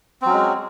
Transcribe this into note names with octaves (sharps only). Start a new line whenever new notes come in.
F#3 G#3 C4 C#4